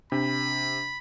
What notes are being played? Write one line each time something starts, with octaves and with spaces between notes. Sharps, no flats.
C3 D4 B5